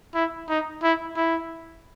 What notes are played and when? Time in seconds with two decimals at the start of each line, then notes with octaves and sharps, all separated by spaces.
0.15 E4
0.49 D#4
0.83 E4
1.16 E4